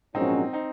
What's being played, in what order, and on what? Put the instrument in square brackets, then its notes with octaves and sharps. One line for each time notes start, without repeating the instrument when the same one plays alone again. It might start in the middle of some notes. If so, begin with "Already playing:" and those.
[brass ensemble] A#1 G#2 F#3 C#4 [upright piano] C4 D#4
[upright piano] C4 D#4